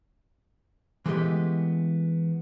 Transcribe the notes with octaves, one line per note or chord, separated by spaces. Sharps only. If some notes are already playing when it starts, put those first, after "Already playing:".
E3 G#3 A3 B3 G4 D#5